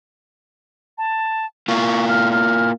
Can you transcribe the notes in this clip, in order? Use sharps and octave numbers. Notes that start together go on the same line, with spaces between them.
A5
A#3 E4 F4 C#6
F6
F6